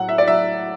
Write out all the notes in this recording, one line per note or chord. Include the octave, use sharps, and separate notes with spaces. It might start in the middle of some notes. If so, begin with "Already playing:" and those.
Already playing: A2 F#3 F#5
E5
D5
F#3 E5